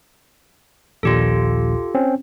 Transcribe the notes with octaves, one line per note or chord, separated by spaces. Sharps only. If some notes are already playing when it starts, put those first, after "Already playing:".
A#1 D#2 A#2 F4 G4 A4
C4 C#4